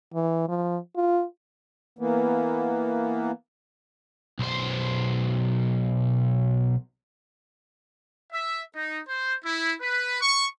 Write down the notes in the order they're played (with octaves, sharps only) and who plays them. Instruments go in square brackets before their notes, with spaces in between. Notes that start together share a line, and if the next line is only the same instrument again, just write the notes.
[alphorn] E3
F3
F4
[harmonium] E3 A#3 B3
[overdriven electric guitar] B1 C5
[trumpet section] E5
D#4
C5
E4
B4
C#6